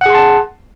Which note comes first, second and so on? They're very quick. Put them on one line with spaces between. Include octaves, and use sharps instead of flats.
F#5 G#4 C6 A5